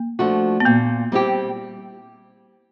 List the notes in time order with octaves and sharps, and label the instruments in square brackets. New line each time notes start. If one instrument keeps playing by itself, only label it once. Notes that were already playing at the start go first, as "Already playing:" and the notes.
Already playing: [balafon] A#3
[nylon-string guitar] F3 A3 D4 F#4
[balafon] B3
[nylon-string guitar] A#2 [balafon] A#3
[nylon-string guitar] G3 C4 E4 G4